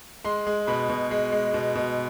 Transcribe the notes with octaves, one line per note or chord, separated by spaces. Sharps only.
G#3 C6
G#3
B2 B5
B2
G#3
G#3
B2
B2